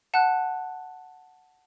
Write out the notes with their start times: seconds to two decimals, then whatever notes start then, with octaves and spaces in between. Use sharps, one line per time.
0.14 F#5 A5 F#6